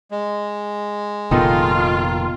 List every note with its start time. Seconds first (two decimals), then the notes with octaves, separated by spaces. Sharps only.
0.11 G#3
1.31 F1 A#2 D#3 B3 D#4 F4 A4